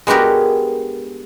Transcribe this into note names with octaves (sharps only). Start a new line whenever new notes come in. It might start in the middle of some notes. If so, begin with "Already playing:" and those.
G#3 B3 D4 F#4 G4 A#4